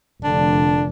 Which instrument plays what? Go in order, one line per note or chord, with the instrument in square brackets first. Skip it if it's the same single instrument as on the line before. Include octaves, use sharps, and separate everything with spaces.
[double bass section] F1 [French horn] D3 [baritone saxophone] D4